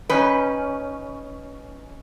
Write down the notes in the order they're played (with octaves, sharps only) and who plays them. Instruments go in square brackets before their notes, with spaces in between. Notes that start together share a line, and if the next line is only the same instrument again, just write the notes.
[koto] C#4 D#4 G5 [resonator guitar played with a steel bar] B4